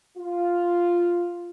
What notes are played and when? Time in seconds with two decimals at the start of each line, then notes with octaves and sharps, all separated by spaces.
0.17 F4